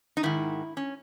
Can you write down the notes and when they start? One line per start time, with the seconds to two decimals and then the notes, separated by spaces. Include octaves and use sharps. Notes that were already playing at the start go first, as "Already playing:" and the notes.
0.17 D#4
0.23 G#2 D#3 E4
0.77 C#4